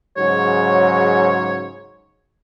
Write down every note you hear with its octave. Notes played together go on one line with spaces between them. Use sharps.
G#2 C#3 F#3 C#5